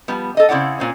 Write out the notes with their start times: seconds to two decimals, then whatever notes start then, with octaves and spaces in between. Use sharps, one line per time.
0.08 F3 G3 B3
0.37 A4 D#5
0.49 C#3 C4 E4 D5 F#5
0.79 A#2 C4 C#4